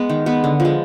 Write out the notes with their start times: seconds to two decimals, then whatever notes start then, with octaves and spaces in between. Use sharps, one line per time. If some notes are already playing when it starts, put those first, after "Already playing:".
Already playing: G#3 B3
0.09 D#3
0.26 G#3 B3
0.44 D3
0.60 F3
0.65 G#3